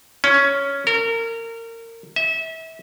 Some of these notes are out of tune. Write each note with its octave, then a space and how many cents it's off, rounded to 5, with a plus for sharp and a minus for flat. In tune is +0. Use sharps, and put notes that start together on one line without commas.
C#4 +5
A#4 -25
E5 -30